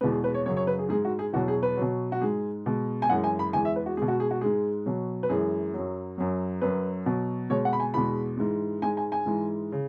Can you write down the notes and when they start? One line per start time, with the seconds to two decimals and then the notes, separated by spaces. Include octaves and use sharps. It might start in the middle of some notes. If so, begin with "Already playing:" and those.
0.01 E2 B2 G#3 B4
0.12 G#4
0.24 B4
0.34 C#5
0.46 F#2 C#3 F#3 C#5
0.57 C#5
0.67 B4
0.79 G#4
0.89 G#2 G#4
0.92 G#3
1.05 F#4
1.19 G#4
1.33 E2 B2 F#3 F#4
1.48 G#4
1.63 B4
1.77 B2 F#3
2.12 F#4
2.21 G#2 G#3 G#4
2.66 B2 G#3
3.02 G#5
3.10 F#2 E3 G#3 F#5
3.24 G#5
3.39 B5
3.53 E2 E3 G#3 G#5
3.65 E5
3.76 B4
3.86 F#4
3.97 B2 G#3 G#4
4.08 F#4
4.20 G#4
4.31 F#4
4.41 G#2 G#3 G#4
4.86 B2 F#3
5.23 B4
5.29 F#2 E3 G#3 G#4
5.74 F#2 F#3
6.18 F#2 F#3
6.61 F#2 F#3 B4
7.06 B2 F#3
7.50 B2 G#3 C#5
7.65 F#5
7.73 B5
7.80 G#5
7.94 E2 B2 G#3 B5
8.37 G#2 E3 G#3
8.82 G#2 G#3 G#5
8.97 G#5
9.12 G#5
9.26 G#2 E3 G#3
9.72 C#3